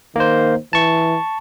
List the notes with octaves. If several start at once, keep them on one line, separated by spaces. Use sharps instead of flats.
D#3 A#3 C5
E3 A5 C#6